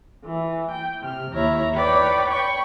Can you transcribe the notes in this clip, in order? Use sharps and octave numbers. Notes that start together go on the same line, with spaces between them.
E3
G5
C3 F6
D#2 E4 C#5 A#5
B4 C#5 D5 G5 B5
G5 B5 C#6